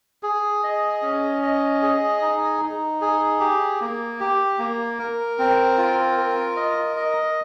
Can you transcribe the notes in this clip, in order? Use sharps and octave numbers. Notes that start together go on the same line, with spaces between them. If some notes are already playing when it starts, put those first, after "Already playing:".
G#4
D#5
C#4
D#5
G#4
D#4
D#4
G#4
G4
A#3
G4
A#3
A#4
C4
F4
A#4
D#5
D#5